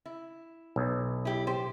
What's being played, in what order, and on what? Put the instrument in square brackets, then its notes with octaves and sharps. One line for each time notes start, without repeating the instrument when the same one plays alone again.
[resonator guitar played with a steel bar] E4
[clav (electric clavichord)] B1
[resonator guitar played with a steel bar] E4 G4
G4 C5